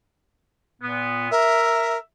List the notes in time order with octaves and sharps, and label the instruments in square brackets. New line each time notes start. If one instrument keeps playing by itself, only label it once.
[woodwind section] A#2 B3
[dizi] A#4 [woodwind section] E5